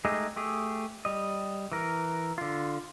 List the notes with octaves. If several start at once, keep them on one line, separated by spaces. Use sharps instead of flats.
G#3 A3 D#4 G4 G#4
A3 G4 G#4
G3 D#5
E3 A#4
D3 F4